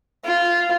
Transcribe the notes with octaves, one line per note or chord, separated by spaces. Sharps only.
F4